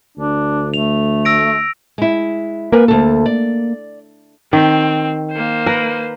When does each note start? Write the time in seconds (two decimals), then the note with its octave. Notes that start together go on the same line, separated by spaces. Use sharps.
0.17 D2 D4
0.74 A3 F7
1.25 E6 A#6 D7
1.98 G#3 E4
2.72 A#3 A#4 B4 G#5
2.88 D2 A4
3.26 D5
4.53 D#3 C4
5.32 A#3 C5
5.66 A#4 B4